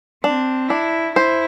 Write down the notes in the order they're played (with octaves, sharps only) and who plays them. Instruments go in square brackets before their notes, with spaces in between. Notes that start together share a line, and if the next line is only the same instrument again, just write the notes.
[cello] C4 [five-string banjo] D4
[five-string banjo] D4 [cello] E4
[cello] E4 [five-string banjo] C5